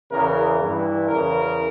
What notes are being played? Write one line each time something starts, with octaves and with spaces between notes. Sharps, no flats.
E2 C#3 E3 A#4
G2 E3
E2 C#3 E3 A#4